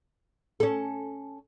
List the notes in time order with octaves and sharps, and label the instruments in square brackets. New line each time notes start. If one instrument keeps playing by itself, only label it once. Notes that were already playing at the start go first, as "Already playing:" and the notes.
[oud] C#4 A4